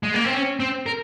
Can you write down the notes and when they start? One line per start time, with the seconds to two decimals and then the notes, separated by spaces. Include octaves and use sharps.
0.03 G#3
0.14 A#3
0.24 C4
0.34 C#4
0.60 C4
0.86 A#4